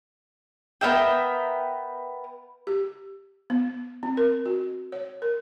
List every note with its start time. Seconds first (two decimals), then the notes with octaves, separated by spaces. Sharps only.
0.81 B3 A#4 E5 G5
2.67 G4
3.50 B3
4.03 C4
4.17 A#4
4.46 F#4
4.92 C#5
5.22 A#4